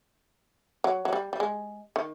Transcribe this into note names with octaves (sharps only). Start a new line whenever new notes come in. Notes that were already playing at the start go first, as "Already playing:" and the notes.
F#3
F#3
G3
G3
G#3
D#3